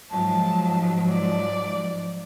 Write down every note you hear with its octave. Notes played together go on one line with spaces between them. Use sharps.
G#2 F3 F#3 A5
D5